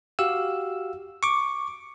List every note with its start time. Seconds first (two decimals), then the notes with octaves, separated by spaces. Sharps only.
0.19 F#4 G4 F5 E6
1.23 C#6 D6